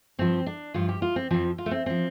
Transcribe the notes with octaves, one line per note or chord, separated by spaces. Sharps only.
G2 F3 C4
D4
G2 F3 F4
G4
F4
C4
F2 F3 C4
F4
A3
C4
F3 C4